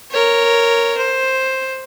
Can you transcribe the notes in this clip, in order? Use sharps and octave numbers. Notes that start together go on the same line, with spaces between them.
A#4 C#5
C5